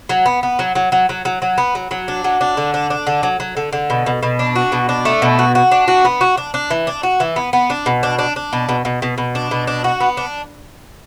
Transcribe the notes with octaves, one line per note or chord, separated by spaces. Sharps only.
F#3
B3
B3
F#3
F#3
F#3
F#3
F#3
F#3
B3
F#3
F#3
D4
F#3
D4
D3
D4
D4
D3
F#3
F#3
D3
D3
B2
B2
B2
D4
F#4
B2
D4
A3
B2
F#4
F#4
D4
F#4
B3
F#4
D4
D4
E3
D4
F#4
E3
B3
B3
D4
B2
D4
D4
D4
B2
B2
B2
B2
B2
D4
B2
D4
F#4
B3
D4